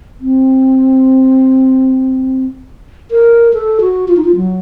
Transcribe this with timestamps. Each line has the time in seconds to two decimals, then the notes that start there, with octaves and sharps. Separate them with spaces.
0.20 C4
3.11 A#4
3.54 A4
3.81 F#4
4.08 F4
4.17 D#4
4.25 F4
4.36 F#3